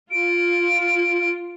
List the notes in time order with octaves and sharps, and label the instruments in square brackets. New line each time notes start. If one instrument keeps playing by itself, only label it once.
[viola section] F4 [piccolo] D7